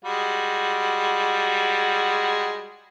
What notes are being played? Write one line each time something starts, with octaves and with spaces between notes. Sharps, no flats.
G3 G#3 F#4